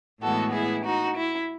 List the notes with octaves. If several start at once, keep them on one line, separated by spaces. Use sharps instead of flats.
A2 E3 G#3 B3 F#4 A4
E4 G#4
D#4 F#4
E4